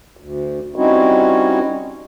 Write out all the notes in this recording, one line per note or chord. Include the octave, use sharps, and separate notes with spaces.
D2
G3 C4 C#4 D#4 E4 F#4